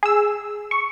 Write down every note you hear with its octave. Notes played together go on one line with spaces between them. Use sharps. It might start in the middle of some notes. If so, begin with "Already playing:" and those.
G#4 E6
C#6